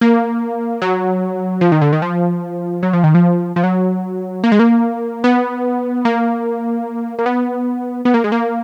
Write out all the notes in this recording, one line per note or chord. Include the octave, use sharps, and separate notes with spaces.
A#3
F#3
F3
D#3
D3
D#3
F3
F#3
F3
D#3
F3
F3
F#3
A#3
G#3
A#3
B3
A#3
A#3
B3
B3
A#3
G#3
A#3